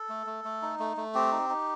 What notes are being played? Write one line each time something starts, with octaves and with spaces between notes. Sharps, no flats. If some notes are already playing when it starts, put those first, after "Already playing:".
Already playing: A4
A3
A3
A3
D#4
A3
A3
C4 G4
D#4
D#4